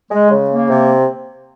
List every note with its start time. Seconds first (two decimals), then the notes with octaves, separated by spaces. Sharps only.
0.11 G#3
0.30 C#3
0.50 A#3
0.70 C3